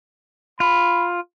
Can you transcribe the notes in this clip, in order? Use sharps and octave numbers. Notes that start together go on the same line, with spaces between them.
F4 B5